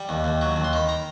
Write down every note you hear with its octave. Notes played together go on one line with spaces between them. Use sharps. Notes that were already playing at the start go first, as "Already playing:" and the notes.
Already playing: G3
D#2
D#2
F#3
D#2
C6
D#3 B5
A#5